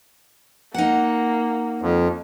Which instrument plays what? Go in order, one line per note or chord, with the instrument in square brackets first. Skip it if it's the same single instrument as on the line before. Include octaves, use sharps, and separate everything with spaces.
[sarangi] A#3 [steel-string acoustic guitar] D#4 F#5
[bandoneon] F2